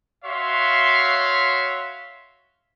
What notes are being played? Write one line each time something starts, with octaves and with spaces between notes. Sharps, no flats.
F#4 C#5 E5 F5 C6